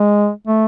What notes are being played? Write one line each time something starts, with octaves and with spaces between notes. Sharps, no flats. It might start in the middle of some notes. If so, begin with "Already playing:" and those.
Already playing: G#3
A3